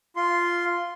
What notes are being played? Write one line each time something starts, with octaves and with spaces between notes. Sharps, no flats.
F4 C6